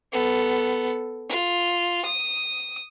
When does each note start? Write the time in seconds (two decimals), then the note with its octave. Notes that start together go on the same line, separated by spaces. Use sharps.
0.12 B3 A4
1.29 F4
2.05 D#6